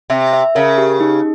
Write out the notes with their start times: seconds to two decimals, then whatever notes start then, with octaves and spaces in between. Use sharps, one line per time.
0.10 C3 E5
0.33 E5
0.55 C#3 A#4
0.78 G4
1.00 D#4